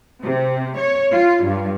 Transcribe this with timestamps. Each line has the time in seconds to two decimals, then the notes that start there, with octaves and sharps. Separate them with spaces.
0.23 C3
0.78 C#5
1.12 F4
1.44 G2